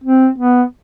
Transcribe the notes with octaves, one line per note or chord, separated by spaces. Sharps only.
C4
B3